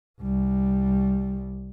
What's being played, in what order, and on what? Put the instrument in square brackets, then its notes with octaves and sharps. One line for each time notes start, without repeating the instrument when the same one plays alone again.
[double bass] C2 G3